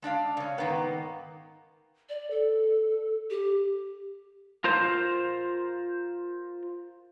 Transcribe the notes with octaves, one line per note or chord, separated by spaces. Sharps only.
G#3 D4 D5 F5
C#3 C#4
G#2 D#3 A#3 B3
D5
A4
G4
F4 A#4 C5